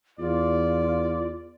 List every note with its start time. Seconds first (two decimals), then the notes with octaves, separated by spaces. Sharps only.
0.19 E2 F4 D5